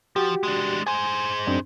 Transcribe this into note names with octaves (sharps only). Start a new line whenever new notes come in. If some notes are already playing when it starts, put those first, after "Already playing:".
F3 F#4 G4
G#3 D4
G#4 C5 G#5
F#2 C4 D4